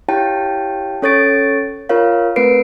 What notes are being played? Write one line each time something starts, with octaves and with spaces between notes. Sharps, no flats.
E4 G4 C#5 F5 G5 A5
C#4 A4 C#5 C#6 A6 D7
F4 A#4 C#5 F5
A3 C4 A#4 B4 C7 D7